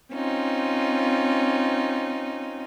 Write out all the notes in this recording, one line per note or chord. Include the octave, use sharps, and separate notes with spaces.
C4 C#4 D#4 F4